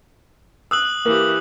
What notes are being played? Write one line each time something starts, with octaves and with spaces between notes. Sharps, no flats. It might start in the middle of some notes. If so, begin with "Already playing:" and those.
D#6 E6 F#6 F#7
E3 A#3 G4